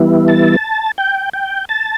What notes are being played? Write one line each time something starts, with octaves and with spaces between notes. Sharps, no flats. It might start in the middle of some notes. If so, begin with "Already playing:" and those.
Already playing: E3 G3 B3 E4
A5
G5
G5
A5